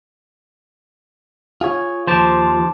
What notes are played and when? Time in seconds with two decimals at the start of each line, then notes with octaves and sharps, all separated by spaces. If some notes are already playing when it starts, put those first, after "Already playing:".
1.61 F4 G#4 C#5
2.07 D#2 F3 C5 A5 D6